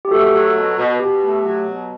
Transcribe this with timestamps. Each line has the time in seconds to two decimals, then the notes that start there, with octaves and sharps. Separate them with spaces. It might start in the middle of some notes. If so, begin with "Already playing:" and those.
0.05 G4
0.11 A3 F#4 A4
0.33 F#3
0.55 B2
0.77 B2
0.99 B2 G4
1.22 A3
1.44 F#3
1.66 B2